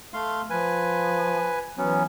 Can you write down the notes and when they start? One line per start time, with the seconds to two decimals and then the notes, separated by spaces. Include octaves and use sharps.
0.14 A3 F5 C6
0.50 F3 B4 G#5
1.78 E3 F#3 B3 C#4